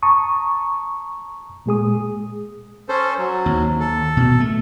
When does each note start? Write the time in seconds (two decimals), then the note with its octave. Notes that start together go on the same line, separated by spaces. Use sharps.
0.03 A5 A#5 C#6 D#6
1.66 A#2 G#3 G#4 D#6
2.89 C#4 A4 C5
3.18 F#3
3.46 D#2
3.80 A4
4.17 B2
4.40 A3